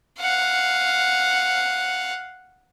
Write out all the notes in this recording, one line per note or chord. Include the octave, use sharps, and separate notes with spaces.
F5 F#5